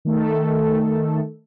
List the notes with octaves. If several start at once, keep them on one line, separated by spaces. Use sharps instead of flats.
D#3 A3 A4